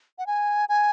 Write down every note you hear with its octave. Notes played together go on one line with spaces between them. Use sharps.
F#5
G#5
G#5